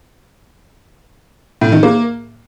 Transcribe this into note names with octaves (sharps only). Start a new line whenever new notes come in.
A2
D#3
A#3